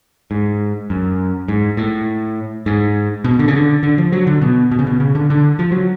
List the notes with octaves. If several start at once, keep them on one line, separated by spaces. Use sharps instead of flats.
G#2
F#2
G#2
A2
G#2
B2
D3
C#3
D3
D3
F3
F#3
D3
B2
B2
C#3
B2
C#3
D3
D3
F3
F#3